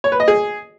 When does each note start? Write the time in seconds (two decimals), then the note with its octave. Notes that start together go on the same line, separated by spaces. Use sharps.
0.04 C#5
0.12 B4
0.20 D#5
0.28 G#4